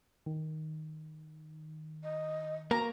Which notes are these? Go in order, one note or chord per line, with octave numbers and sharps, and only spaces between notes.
D#3
D#5
A#3 F#4 A#5